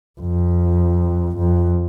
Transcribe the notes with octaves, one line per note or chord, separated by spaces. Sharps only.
F2
F2